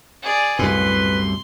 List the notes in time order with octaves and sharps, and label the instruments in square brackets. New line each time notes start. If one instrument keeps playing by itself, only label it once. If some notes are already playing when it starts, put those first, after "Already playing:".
[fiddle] G#4 D5
[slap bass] C2 F#2 A2 [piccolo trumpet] B4 [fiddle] C6